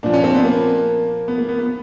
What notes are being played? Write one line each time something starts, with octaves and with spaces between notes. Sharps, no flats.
A#2 F3 D4
C#4
C4
B3
A#3
B3
A#3
B3
B3